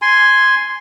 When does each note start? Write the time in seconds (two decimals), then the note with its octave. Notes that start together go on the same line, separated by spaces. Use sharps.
0.02 G#5 C6